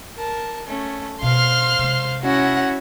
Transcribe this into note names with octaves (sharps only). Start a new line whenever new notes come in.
A#4 A5
A3 C#4
B2 C5 F5 C6 F6
C3 G#3
C#4 E4 F#4 F#5 A#6